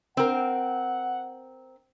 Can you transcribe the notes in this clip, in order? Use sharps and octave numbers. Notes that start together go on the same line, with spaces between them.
C4 A#4 F#5